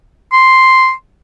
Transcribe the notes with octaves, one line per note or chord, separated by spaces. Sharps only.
C6